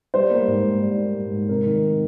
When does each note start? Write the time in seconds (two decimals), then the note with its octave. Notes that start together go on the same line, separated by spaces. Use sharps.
0.14 G3 C5
0.30 A#3
0.48 G#2
0.64 G#2
0.82 G3
0.98 A#3
1.15 G#2
1.32 G#2
1.49 C3 A#4
1.66 D#3